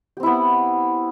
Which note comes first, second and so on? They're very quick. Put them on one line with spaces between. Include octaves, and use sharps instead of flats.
G4 C4 E4 B3